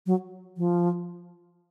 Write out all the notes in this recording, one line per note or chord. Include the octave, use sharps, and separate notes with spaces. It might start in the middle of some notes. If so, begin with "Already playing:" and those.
F#3
F3